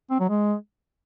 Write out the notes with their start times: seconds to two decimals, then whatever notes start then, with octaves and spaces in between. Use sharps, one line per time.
0.10 C4
0.20 F#3
0.29 G#3